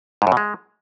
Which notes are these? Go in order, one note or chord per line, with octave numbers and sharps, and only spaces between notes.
G#2
F#2
B2
G#3